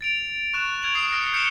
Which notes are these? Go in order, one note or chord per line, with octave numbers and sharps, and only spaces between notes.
A6 D7 F7
C#6 F#6 E7
F6 G#6 D7 F7 F#7
D#6 C7 D7
F6 A#6 C#7 D7
G6 C#7 D7 E7 G7